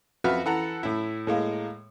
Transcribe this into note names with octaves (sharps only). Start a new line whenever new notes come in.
F2 F#4 B4 E5 F6
E3 A4 F#5 A#5
A2 E4
A2 G#3 A#3